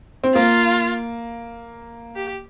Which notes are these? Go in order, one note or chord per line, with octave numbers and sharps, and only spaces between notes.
C4
A#3 F4
G4